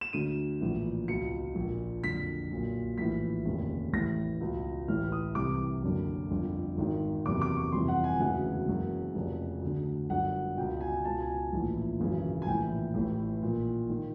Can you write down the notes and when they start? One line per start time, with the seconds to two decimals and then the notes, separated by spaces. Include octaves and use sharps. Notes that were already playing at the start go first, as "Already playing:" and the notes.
0.01 E7
0.13 D2 D3 D#7
0.61 A#1 A2 E3
1.08 C#2 B2 C#7
1.55 A#1 A#2
2.03 F#1 F2 D3 B6
2.50 B1 A#2
2.98 A#1 A2 E3 B6
3.45 F1 D#2 C#3
3.93 A1 A2 E3 A#6
4.40 C#2 B2
4.88 A1 A2 E3 F6
5.12 D#6
5.35 C2 C3 E3 D6
5.82 F#1 F#2 D3
6.30 G1 F2 D3
6.78 G#1 G#2 D#3
7.26 F#1 E2 C3 D6
7.42 D6
7.57 C#6
7.72 G1 F2 C3 E3 C6
7.88 F#5
8.04 G#5
8.19 E1 D2 C#3 E3 F#5
8.67 F#1 F#2 C#3 E3
9.15 F1 F2 C#3
9.62 D2 D3
10.09 G1 F#2 D3 F#5
10.57 C#2 B2 G5
10.81 G#5
11.05 C#2 B2 A5
11.20 G#5
11.53 A#1 A2 E3
12.00 G#1 F#2 C#3 E3
12.42 G#5
12.46 A#1 A2 E3 G5
12.94 A1 A2 E3
13.42 A#1 A#2
13.90 D#3